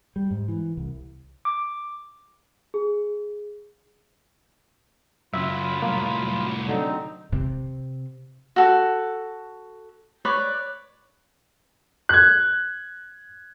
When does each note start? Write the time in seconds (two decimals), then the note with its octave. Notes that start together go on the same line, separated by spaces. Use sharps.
0.16 G3
0.31 G#2
0.48 E3
0.77 C2
1.45 D6
2.74 G#4
5.34 F#2 C#3 F#3 F4 E5 B5
5.82 C2 A2 A#3
6.69 D3 C4 D#4
7.33 C3
8.56 F#4 A4
10.25 B4 C#5 D5
12.09 F#6 G#6